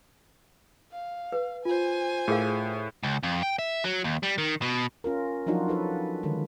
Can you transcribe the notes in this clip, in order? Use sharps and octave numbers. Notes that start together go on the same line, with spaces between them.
F5
B4
F4 C5 G#5
A2 G#4 A#4 F5
C#2
F2
G5
E5
F#3
D#2
G3
D#3
B2
C#4 F4 A#4
F3 F#3 D4 D#4 F4 F#4
D#4 A4 B4
D3 D#3 G#3